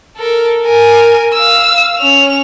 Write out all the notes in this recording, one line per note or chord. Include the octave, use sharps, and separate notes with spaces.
A4 A#4
A#4 G#5
F5 E6
C#4 F7